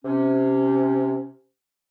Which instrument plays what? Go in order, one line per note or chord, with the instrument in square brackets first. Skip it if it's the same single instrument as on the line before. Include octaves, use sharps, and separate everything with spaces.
[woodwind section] C3 C#4